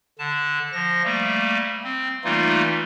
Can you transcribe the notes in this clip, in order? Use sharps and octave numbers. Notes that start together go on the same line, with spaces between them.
D3 A5
F3 A#6
G3 A3 A#3
C4
E3 G3 A3 A#3 D#4 F4